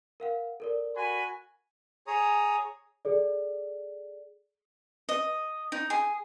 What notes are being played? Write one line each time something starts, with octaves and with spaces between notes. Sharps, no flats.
A#4 F5 F#5
A4 A#4 D5
F#4 G#5 B5
G#4 C#5 A#5 D#6
G#4 A4 D5
D#5
D#4
G#4